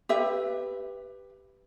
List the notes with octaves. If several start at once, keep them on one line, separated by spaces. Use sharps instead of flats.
G4 B4 E5